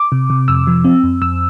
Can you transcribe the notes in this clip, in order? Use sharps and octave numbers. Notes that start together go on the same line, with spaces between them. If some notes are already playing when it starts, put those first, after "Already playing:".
Already playing: D6
C3
C3
F2 E6
F3
C4
F2
F2 E6